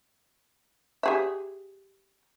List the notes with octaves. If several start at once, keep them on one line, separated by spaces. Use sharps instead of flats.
G4 G#4 E5